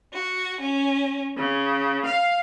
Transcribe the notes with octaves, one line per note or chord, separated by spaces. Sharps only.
F#4
C#4
C#3
F5